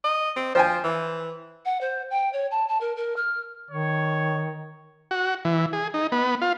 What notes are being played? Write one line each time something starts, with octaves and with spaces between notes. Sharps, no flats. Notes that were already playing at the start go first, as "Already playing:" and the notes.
D#5
C4
F3 C5 G5 G#5
E3
F#5
C5
G5
C#5
A5
A5
A#4
A#4
F6
D#3 C#5
F#4
E3
G#4
D#4
B3
F4